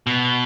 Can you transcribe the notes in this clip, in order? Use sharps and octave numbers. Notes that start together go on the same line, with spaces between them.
B2